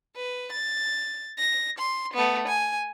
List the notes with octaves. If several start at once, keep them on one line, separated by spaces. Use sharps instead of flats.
B4
A6
A#6
C6
A3 B3
G#5